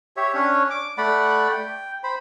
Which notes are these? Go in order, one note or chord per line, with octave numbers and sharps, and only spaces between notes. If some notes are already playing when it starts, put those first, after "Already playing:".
G4 C#5 E5
C#4 D4 C#5
D6
A3 D5 F#5 B5
G5
C5 B5